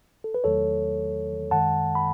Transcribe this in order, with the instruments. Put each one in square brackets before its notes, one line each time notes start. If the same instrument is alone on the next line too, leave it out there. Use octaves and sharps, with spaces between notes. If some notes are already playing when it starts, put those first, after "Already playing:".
[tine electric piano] A4
B4
E2 D#3 F#3 A3 A4 C#5
F#2 D#3 G#3 F#5 A5
B5